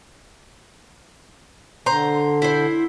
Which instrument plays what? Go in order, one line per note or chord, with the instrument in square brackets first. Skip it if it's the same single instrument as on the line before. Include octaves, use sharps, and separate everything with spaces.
[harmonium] D3 [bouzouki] C5 A#5
[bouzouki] E4 C5